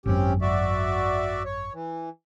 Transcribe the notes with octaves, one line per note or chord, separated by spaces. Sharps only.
G#1 F#2 C4 C#4 G4
F#4 D5 E5
C#5
E3